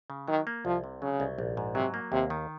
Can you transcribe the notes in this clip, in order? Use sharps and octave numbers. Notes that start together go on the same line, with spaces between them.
C#3
D#3 F#3
A#3
C2 F3
C3
C#3 F#3
C2
A#1
G#2
C3 F#3
A#3
D#2 C3
D#3